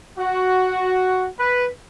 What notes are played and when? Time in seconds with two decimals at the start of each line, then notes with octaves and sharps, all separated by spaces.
0.19 F#4
1.39 B4